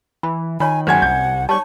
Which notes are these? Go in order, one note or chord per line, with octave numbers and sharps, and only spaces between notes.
E3 B5
D#3 F4 C#5 G#5 B5
F#1 C5 F#5 G#5 G#6
C2 G6
G3 D#4 C#5 A5 C#6